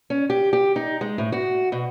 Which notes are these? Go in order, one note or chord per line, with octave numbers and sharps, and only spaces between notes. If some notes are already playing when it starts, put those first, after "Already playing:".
C#4
G4
G4
D#4
G#3
A2
F#4
B2